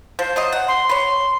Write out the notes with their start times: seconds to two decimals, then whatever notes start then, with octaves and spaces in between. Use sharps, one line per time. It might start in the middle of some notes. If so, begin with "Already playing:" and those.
0.19 F3 C5
0.36 F#3 F4 D#5
0.52 F#5
0.68 C6
0.89 B4 C#5